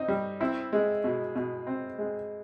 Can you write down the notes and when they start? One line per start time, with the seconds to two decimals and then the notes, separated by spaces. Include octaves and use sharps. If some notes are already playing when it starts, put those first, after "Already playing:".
Already playing: C4 D#4
0.08 G3
0.40 C4 E4
0.73 G#3
1.04 B2
1.35 B2
1.67 C4
1.98 G#3